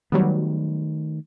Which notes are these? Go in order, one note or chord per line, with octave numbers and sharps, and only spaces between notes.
D#3 F#3 G3 A3 B3